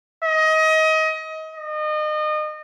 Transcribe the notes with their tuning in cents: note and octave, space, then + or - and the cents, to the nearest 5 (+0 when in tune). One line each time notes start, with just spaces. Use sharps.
D#5 +25
D#5 -30